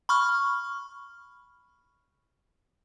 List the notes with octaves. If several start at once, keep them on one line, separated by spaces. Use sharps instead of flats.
B5 C#6 F6